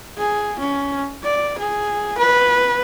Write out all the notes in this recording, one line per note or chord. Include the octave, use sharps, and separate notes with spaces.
G#4
C#4
D5
G#4
B4